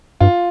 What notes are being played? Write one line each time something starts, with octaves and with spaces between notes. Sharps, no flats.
G2 F4